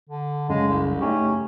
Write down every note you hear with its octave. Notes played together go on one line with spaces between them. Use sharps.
D3
F#2 C#3 G#3
C2
A3 C#4 D#4 G4